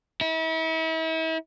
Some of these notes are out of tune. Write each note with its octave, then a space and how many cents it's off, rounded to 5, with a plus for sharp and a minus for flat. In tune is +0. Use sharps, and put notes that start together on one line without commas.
E4 -40